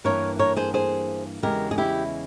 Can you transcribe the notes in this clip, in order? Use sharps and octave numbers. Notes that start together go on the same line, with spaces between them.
G2 E3 A#3 A#4 C#5
A#4 C#5
G#4 C5
G#4 C5
E2 C#3 E3 G#3 G4 A#4
G#4
E4 G4